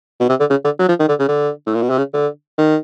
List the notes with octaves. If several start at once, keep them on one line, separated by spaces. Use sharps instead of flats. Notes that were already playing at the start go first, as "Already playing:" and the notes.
B2
C3
D3
C#3
D3
F#3
F3
D#3
D3
C#3
D3
A2
A#2
B2
C3
C#3
D3
D#3